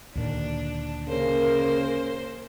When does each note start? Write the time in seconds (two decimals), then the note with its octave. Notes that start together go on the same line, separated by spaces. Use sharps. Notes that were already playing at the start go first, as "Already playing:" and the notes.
0.15 D2 A#2 D#3 D4
1.08 C#3 A#3 A#4 C5